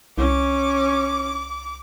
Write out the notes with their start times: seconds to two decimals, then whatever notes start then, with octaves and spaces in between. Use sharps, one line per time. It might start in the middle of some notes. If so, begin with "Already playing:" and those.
0.18 C2 C#4 D6